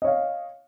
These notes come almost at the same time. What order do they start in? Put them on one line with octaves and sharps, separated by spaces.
D#5 C#5 F5